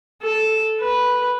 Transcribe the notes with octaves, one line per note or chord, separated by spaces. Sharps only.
A4
B4